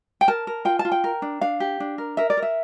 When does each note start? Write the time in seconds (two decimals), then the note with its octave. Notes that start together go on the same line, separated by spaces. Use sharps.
0.21 G5
0.28 A#4 A5
0.47 A#4
0.65 F4 G5
0.79 A5
0.85 F4
0.92 G5
1.04 A#4
1.22 D4
1.41 D4 F5
1.60 G4
1.80 D4
1.98 A#4
2.17 A#4 E5
2.30 D5
2.37 A#4
2.43 E5